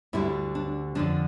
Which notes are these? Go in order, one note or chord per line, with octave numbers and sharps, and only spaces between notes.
D2 D3 G3 E4
D4
F2 D3 F3 D4